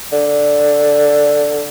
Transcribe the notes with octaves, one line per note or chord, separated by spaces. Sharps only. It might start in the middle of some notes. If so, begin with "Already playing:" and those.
D3